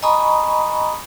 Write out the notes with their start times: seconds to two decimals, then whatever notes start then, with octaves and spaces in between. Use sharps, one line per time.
0.03 D#5 G#5 A#5 B5 C#6 D#6